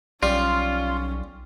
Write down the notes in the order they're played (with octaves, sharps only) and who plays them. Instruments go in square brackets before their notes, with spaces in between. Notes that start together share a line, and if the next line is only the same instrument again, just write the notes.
[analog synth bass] B1 [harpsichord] G3 [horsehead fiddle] C#4 [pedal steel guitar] F4